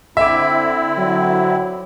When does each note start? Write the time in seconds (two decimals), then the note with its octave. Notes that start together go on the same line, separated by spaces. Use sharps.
0.17 D3 C4 E4 E5 D6
0.98 F#3